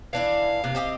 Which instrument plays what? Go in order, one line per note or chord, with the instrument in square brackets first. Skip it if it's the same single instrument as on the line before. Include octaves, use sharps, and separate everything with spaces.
[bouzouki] E3 D4 E4 [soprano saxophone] F5
[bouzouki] C3 E3 A#3
C4 G4 D#5